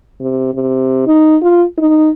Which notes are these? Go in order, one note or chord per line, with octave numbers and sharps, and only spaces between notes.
C3
C3
D#4
F4
D#4